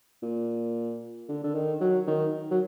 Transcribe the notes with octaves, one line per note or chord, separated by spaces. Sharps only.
A#2
D3
D3
D#3
F#3
D#3
F#3